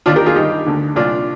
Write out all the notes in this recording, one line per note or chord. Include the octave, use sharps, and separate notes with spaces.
D#2 D#3 D4 F4
G4 A#4
F4 G#4
G2 D#3 D#4 G4
D2 D3
C2 A#2 D4 F4